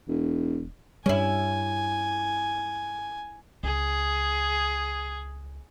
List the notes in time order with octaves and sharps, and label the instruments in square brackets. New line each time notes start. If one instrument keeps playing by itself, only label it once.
[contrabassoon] E1
[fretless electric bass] G2 G3 [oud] C#4 E4 [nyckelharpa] G#5
[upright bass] C#2 [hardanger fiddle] G#4